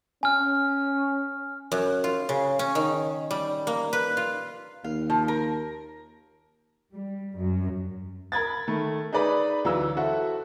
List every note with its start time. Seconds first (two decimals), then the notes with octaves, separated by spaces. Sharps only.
0.23 C#4 G#5 F6
1.72 F#2
2.04 F4
2.29 C#3
2.59 C#4
2.75 D#3
3.31 G3
3.67 A#3
3.93 B4
4.17 F4
4.84 D#2 F5
5.10 F3
5.28 A#4
6.91 G3
7.34 F#2
8.32 A#4 B5 G#6 A6
8.68 D#3 A3 A#4
9.13 D#4 G#4 B4 D5 A#5 B5
9.64 D2 E3 F#3 F4 A#5 E6
9.97 E4 F#4 A4 C5 E5 F#5